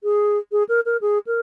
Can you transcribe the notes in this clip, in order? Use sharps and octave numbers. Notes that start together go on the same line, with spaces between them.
G#4
G#4
A#4
A#4
G#4
A#4